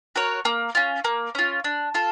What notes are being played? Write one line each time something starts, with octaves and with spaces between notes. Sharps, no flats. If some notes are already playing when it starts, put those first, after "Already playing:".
F#4 A#4 C#5
A#3
C#4 F4
A#3
C#4 F4
D4
F4 A4